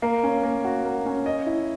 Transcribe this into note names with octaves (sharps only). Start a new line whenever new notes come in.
A#3
C#4
A#3
F#4
A#3
C#4
D#5
E4